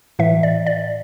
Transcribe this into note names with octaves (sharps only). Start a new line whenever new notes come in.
A2 E3 E5
D5
D5